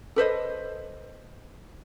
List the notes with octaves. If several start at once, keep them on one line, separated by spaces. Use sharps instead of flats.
A4 B4 C5 D#5